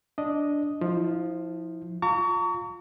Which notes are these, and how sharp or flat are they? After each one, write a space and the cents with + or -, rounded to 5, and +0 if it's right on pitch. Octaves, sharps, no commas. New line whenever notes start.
D4 -5 D#5 +0
F3 +5 E4 -30
F4 +15 A#5 -35 C#6 +35